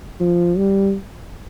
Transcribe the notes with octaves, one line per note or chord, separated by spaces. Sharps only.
F3
G3